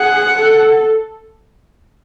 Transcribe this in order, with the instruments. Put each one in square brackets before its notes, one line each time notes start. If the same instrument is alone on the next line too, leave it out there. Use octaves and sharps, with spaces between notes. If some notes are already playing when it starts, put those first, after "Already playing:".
Already playing: [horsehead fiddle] G#4 [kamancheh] F#5
[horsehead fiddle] A4